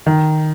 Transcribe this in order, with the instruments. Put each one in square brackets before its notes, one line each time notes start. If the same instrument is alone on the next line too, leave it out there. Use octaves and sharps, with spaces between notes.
[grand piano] D#3